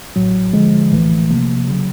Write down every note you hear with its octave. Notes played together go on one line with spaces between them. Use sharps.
A1 A2 F#3
D3 F3 G#3
A#1 A2 E3 A3
C3 F3 A#3
C#3 F#3